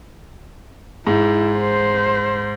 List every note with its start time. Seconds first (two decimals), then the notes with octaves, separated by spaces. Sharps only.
1.07 G#2 E4
1.59 C5